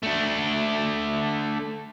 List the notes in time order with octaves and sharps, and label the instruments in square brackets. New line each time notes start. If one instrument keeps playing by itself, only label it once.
[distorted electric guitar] A3 D4